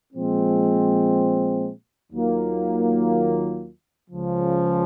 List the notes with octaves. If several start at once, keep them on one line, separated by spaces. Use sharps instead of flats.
A#2 F3 G#3 C4
D#2 D#3 F#3 A#3 F4
C#2 C#3 F3